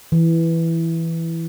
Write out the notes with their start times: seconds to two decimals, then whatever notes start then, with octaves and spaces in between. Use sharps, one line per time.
0.12 E3